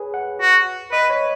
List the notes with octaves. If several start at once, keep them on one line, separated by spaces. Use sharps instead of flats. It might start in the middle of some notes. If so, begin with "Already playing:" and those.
Already playing: G#4 B4 C#5
F#5
F#4
B4 D#5
C#5